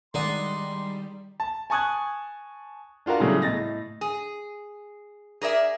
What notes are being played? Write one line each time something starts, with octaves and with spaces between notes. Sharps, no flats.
D#3 G3 G#3 D#4 D5 F#5 C6
A5
G#5 A5 C#6 D#6 F#6 G#6
D4 F4 F#4 A#4 F5
A2 C#3 F#3 G3 A3
A2 D#5 A6 A#6
G#4
G#4 A#4 D5 E5